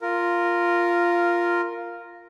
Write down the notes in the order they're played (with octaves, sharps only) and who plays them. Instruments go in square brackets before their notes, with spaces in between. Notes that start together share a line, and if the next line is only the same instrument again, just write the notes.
[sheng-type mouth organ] F4 A#4